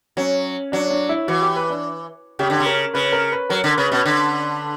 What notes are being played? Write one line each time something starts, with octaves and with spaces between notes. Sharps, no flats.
F#3 C#4
F#3 D4
D4
E4
E3 F#4
G4
B4
D4
C#3 G4
D3
C#3
A#4
C#3 B4
A#4
B4
F#3 A#4
D3
C#3 B4
B2
D3